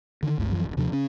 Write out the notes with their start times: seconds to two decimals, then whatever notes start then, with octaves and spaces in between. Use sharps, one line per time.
0.23 D3 D#3
0.38 G1 C#2 G2 A3
0.52 F#2 E3 F3
0.65 D1 F2
0.77 D#2 C3 F3 D4
0.92 C#3 C#4